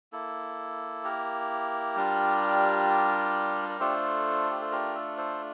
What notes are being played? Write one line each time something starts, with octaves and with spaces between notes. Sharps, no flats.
A#3 E4 A4
G4 A#4
G3 D4 F4
A#4
A3 D4 F4 A4 C5
G4
A4
G4 A#4
A4
A4 C5